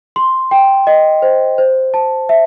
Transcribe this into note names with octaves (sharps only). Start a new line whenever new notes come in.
C6
G5
D#5
C5
C5
A5
E5